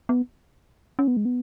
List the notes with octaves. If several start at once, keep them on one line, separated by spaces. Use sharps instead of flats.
B3
C#4
B3
G#3
B3